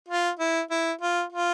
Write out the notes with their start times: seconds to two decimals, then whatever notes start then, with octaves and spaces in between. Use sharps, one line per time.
0.08 F4
0.39 E4
0.71 E4
1.01 F4
1.32 F4